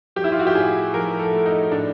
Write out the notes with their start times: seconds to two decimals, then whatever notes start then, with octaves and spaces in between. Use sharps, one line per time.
0.16 F3 G4
0.24 E4
0.32 F4
0.39 F#4
0.47 G4
0.55 A2 G#4
0.94 F3 A#4
1.19 A4
1.33 A3
1.46 D#4
1.71 A2 D4